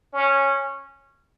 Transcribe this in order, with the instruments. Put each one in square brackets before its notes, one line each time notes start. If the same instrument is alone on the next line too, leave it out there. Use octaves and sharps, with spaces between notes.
[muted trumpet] C#4